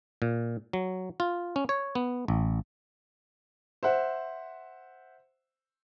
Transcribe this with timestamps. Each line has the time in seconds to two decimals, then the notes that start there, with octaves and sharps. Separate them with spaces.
0.22 A#2
0.73 F#3
1.20 F4
1.56 C#4
1.69 C#5
1.95 B3
2.28 A1
3.83 C5 E5 F#5